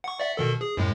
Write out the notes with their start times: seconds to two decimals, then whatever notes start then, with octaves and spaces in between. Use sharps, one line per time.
0.04 F#5 C#6
0.20 D5 E5 F#5
0.37 B2 D#3 A4
0.61 G#4
0.77 F#2 A2 G#3